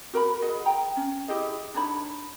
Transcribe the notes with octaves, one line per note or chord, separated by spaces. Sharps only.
F#4 A#4 G5 B5
G#4 D#5 F#5
G5 A#5
C#4
E4 G4 G#4 D#5
D4 D#4 C#5 B5